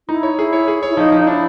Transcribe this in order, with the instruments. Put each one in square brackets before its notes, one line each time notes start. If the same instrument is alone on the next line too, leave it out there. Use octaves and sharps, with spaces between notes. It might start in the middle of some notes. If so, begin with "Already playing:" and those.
[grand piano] D#4 [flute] E4
[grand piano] C#5
[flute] E4 [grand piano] G#4
[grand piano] C#5
G#4
C#5
[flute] E4
[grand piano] F3 [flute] D#4
[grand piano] F3
[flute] D#4
[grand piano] D4 [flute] E4